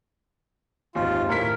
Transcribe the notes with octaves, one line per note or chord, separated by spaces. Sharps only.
G#1 D#2 F4
A2 A#4 B6